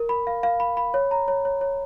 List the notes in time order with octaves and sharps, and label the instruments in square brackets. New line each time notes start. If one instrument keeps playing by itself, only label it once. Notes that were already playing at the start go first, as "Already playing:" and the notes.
Already playing: [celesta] A#4
B5
F5
F5
B5
B5
C#5
A#5
C#5
C#5
C#5